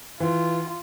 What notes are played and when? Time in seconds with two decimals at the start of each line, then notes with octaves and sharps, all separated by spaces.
0.20 E3 F4